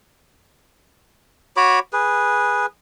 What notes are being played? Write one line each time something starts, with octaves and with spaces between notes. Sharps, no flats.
F#4 C#5 B5 D6
G#4 B4